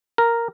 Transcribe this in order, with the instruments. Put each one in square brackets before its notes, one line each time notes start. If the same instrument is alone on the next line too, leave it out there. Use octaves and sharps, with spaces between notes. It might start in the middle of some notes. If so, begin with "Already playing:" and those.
[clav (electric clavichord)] A#4